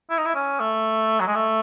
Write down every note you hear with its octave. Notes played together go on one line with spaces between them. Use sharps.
E4
D#4
E4
C#4
A3
F#3
G#3
A3